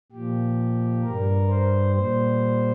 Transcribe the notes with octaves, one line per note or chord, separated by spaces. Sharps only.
A#2 F3 G4
G2 G3 A#4
C5
A#2 G3 C5